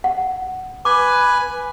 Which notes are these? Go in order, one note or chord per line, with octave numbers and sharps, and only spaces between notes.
F#5
B4 G#5 D6